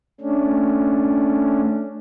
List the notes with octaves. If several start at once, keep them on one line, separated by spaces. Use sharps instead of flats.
A3 C#4 D4